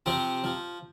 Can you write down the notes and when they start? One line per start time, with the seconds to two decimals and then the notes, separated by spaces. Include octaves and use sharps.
0.06 C3 F3 C4
0.44 F3